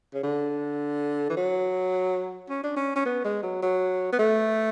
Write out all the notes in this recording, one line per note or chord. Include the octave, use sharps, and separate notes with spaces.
C#3
D3
E3
F#3
C#4
D4
C#4
C#4
B3
G#3
F#3
F#3
B3
A3